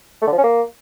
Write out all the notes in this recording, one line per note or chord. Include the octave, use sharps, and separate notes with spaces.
A3
D3
F3
C#4
A#3